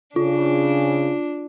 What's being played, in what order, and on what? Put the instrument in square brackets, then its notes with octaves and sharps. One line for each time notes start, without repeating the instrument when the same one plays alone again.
[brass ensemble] C#3 [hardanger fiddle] D4 [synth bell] F4